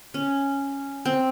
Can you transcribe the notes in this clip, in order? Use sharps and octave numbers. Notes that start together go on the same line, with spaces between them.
C#4
C4